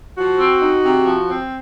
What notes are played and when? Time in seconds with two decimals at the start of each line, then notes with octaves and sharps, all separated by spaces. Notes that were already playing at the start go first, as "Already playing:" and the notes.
0.17 F3 F#4
0.40 C4
0.62 D#4
0.83 C3
1.06 F3
1.28 C4